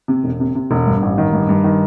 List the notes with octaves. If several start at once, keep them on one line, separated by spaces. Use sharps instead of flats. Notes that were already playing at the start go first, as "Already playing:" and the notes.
C3
E1
C3
C3
E1
G2
A1
D#3
G2
G2
D#3